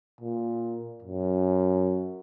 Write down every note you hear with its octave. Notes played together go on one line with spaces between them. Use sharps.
A#2
F#2